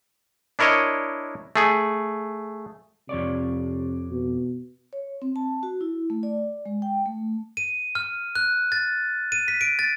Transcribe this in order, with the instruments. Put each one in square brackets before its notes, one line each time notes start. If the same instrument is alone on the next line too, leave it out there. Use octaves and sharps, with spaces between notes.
[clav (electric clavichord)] D4 E4 A#4 C#5 D#5
A3 G#4
[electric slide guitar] F2 C#5 D5 [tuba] C3
[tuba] B2
[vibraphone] C#5
C4
A5
F#4
E4
A3
D5
G#3
G5
A3
[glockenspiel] D#7
F6
F#6
A6
D#7
B6
D7
A6